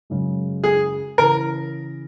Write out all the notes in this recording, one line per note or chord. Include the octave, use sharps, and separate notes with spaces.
F#2 C#3 G#3
G#4
C#3 E3 A#4